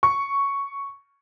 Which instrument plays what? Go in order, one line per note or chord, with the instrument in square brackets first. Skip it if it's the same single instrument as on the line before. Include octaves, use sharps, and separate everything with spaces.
[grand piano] C#6